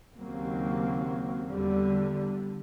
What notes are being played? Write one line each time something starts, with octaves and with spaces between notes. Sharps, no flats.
D#2 C#3 F#3 A#3 C4
E2 D3 G3